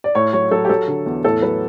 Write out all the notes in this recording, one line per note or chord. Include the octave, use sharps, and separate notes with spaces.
D5
A2 C#5
F#3 C#5
F#3 A4
G4
F#3 A4
D3
E2
A2 A4
F#3 B4